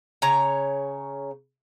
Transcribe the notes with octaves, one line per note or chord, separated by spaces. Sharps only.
C#3 C#5 A#5